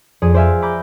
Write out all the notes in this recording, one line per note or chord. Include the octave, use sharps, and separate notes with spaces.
F2 G#4 D5 D#6
C5 D5 E5 F5 G#5
A#5 B5 D6 G6